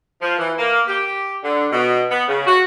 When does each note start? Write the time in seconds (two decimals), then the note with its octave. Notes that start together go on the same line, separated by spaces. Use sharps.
0.22 F3
0.39 E3
0.58 A#3
0.88 G4
1.43 D3
1.72 B2
2.10 B3
2.28 C#3
2.47 F#4